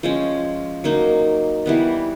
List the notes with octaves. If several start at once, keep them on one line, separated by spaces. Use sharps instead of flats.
F3 G#3 C#4
F#3 A#3 D#4
E3 G3 B3